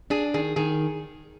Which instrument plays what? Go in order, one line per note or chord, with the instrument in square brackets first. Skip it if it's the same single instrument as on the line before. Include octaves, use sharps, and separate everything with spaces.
[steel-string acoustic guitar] D4 [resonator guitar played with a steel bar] G#4
[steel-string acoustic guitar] D#3 [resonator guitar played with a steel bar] G#4
[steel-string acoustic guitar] D#3 [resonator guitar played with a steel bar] G#4